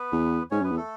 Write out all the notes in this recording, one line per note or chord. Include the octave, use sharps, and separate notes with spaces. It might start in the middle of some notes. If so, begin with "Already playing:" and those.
Already playing: B3 B4
E2
G#2 C#4 C#5
F#2 B3 B4
E2
A3 A4